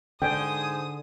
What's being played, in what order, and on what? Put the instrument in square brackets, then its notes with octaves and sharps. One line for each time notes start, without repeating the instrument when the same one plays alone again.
[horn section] G#2 C5 G#5 [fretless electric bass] D3 [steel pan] G5 [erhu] D#6